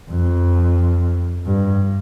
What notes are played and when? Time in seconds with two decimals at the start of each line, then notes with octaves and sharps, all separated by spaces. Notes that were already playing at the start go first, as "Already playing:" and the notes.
0.10 F2
1.46 G2